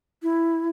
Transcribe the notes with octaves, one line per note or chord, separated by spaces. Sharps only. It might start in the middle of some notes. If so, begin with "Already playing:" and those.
E4